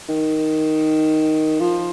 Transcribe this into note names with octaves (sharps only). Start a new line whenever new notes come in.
D#3
F3